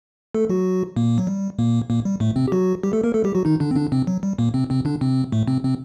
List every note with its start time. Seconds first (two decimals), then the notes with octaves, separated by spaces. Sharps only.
0.34 A3 A4
0.49 F#3 F#4
0.96 A#2 A#3
1.18 F#3
1.27 G3
1.59 A#2 A#3
1.90 A#2 A#3
2.05 G3
2.20 A2 A3
2.36 C3 C4
2.48 G4
2.52 F#3 F#4
2.83 G3 G4
2.93 A3 A4
3.04 A#3 A#4
3.14 A3 A4
3.24 G3 G4
3.35 F#3 F#4
3.45 D#3 D#4
3.60 D3 D4
3.71 C4
3.76 D3 D4
3.92 C3 C4
4.07 F#3
4.23 G3
4.38 A#2 A#3
4.54 C3 C4
4.70 C3 C4
4.85 D3 D4
5.01 C3 C4
5.32 A2 A3
5.47 C3 C4
5.63 C3 C4